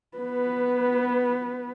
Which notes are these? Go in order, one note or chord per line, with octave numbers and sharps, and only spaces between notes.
B3 B4